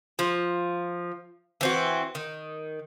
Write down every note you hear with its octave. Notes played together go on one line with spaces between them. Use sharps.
F3
E3 C4 F#4
D#3